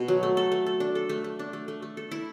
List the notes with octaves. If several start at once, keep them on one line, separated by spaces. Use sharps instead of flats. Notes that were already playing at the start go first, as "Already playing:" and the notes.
Already playing: B2
F#3
A3
A4
A3
A4
D4
A4
A3
A3
D4
A3
A3
A3
A4
E4